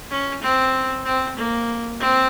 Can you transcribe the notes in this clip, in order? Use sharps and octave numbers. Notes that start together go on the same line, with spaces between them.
C#4
C4
C4
A#3
C4